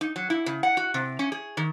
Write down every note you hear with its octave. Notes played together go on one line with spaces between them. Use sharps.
D#4
F#3
E4
C#3
F#5
F#4
C3
C#4
G#4
D#3